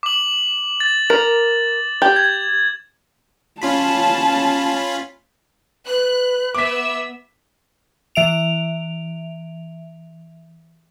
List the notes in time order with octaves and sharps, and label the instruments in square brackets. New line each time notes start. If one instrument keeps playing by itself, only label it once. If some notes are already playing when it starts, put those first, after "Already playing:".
[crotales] D6 F#7
A6
[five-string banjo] A#4
G4
[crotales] G#6
[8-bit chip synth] C#4 F4 B5 [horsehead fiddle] A5
[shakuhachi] B4 [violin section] F#6
[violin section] B3 E5 E6 [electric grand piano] D6 B6
[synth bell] E3 E5 D7 F7